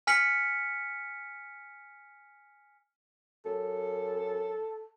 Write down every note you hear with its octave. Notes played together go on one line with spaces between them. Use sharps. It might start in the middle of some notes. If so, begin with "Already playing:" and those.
G#5 F6 B6 C#7 F#7
F#2 A4